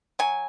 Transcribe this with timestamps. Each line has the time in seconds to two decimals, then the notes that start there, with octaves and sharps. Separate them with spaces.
0.19 F#3 G#5